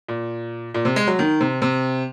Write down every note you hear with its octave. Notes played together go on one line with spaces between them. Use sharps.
A#2
A#2
C3
G#3
F#3
D#3
C3
C3